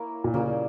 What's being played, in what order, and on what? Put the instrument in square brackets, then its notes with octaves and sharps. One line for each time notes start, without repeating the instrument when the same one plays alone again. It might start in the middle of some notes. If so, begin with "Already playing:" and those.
Already playing: [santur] A#3 E4 A#4 C#5
[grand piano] A#2
[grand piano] C#3 [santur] G3 A#3 C#4